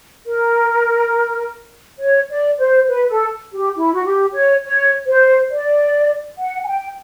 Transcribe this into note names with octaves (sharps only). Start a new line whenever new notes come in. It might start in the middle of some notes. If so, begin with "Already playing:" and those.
A#4
C#5
D5
C5
B4
A4
G4
E4
F#4
G4
C#5
C#5
C5
D5
F#5
G#5
G5